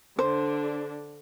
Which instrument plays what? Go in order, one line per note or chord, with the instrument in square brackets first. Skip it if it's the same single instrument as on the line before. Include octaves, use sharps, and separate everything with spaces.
[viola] D3 D4 [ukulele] C5